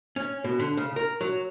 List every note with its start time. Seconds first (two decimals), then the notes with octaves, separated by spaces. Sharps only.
0.16 C#4
0.44 B2
0.60 D3
0.77 C#3
0.96 A#4
1.21 F#3